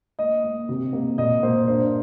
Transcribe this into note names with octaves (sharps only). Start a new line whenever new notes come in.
A#3 D#5
A#3
C3
A#3
A#2 D#5
A#3 C5
G2 C5